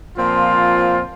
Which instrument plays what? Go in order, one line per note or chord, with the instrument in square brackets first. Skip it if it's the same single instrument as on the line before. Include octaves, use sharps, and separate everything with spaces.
[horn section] A#2 F3 C4 F4